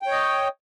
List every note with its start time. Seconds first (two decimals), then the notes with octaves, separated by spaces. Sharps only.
0.02 G5
0.07 C#5
0.11 D#5